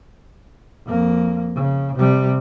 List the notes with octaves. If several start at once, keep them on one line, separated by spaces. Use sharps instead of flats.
F2 A#3
C#3
C3 G3